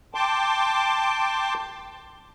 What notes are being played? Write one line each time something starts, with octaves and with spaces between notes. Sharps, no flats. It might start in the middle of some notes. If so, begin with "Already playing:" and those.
G5 A5 C6 D6